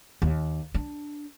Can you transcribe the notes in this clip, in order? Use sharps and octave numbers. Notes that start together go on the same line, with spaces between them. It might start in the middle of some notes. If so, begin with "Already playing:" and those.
D#2
D4